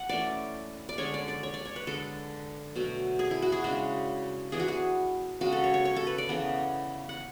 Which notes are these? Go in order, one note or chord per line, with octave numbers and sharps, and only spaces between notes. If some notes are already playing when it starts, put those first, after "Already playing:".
Already playing: F#5
E3 A3 C#4 D5
D5
D3 G#3 C#4 C#5
D5
D5
C#5
D5
C#5
B4
D3 G#3 D4 A4
B2 F#3 A3
G#4
E4
F#4
G#4
C#3 G#3 D4 F#4
E3 B3 D4 G#4
F#4
G#4
C#3 G#3 C#4 F#4
A4
C#5
C#5
C#5
A4
B4
D5
C#3 E3 B3
F#5